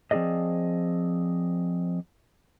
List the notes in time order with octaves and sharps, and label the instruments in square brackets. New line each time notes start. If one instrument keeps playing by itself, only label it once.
[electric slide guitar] F3 C4 D#4 G#4 D5 D#5